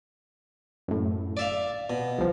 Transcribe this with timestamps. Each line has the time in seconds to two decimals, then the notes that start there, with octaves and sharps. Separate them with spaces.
0.88 F#2 A2
1.37 D5 E5 F5
1.90 B2
2.19 C2 F3